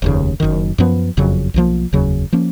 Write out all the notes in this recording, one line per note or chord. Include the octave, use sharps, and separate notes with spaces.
F1 D#2 C#3
F#1 F#2 D#3
F#2 F3 B3
F#1 F2 C#3 F#3
B1 A#2 F3 A#3
F1 D#2 C#3 F#3
F3 A#3 C#4